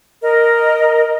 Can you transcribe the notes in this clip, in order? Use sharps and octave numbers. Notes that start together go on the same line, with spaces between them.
A#4 D#5